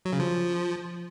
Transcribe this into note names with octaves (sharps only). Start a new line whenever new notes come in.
F#3
C#3
F3